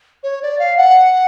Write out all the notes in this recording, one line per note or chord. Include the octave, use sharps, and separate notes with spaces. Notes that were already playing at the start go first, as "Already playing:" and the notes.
C#5
D5
F5
F#5